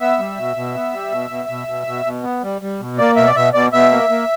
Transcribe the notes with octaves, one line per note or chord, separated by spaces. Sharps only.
B3 E5
G3
B2
B2
B3
G3
B2
B2
B2
B2
B2
B2
B3
G3
G3
B2
A#3 D5
B2 E5
D5
B2 E5
B2 D5
B2 E5
A#3
A#3